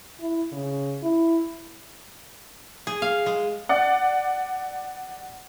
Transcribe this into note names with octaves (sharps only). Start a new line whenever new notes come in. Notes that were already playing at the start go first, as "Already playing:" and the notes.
E4
C#3
E4
G#4
F5
G#3
D5 F#5